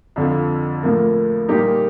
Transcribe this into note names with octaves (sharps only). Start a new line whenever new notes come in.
F2 D3 F3
A2 F3 A#3
A#2 G3 A#3 D#4 G4